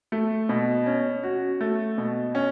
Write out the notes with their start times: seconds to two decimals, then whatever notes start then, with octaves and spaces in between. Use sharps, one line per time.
0.12 A3
0.49 B2
0.86 C#4
1.24 F#4
1.61 A3
1.98 B2
2.35 C#4